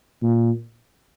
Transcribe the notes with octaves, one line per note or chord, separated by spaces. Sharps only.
A#2